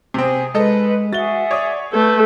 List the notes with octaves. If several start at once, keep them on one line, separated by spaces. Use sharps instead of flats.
C3 C4 G#4
G#3 D#4 A4 B4 D#5
F#4 G#4 E5 F#5 A6 G7
C#5 D5 D#6
A3 A4 B4 G6